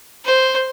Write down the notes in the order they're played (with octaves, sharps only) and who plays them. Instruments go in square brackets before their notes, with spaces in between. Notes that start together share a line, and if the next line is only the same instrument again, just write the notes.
[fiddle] C5